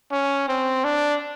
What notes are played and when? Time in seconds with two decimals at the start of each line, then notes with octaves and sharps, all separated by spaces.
0.12 C#4
0.48 C4
0.84 D4